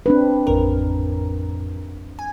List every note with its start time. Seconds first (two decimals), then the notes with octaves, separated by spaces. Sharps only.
0.06 C4 D4 B4
0.47 A1 F2 A#4
2.19 G#5